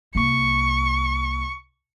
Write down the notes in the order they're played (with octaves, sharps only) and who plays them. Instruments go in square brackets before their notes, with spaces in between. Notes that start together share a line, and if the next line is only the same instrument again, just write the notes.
[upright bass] C2 A#3 [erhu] C#6